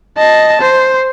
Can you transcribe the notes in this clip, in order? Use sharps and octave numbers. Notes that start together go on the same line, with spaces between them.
D#5 A5
C5